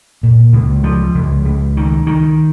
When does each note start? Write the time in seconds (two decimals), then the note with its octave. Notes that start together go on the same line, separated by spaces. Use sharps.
0.23 A#2
0.53 C#2
0.84 F3
1.15 C#2
1.45 C#2
1.77 D#3
2.07 D#3